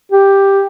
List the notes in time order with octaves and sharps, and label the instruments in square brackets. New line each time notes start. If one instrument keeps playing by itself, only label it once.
[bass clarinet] G4